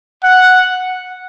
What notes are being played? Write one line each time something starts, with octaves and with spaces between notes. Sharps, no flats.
F#5